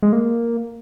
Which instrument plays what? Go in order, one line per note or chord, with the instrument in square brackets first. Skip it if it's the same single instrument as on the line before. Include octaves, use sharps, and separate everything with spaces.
[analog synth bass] G#3
A#3